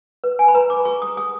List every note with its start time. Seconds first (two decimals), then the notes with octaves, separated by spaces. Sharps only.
0.24 B4
0.39 G#5
0.48 B5
0.54 B4 A#5
0.70 D6
0.85 G#4 C#6
1.02 D#6
1.17 G#4 D#6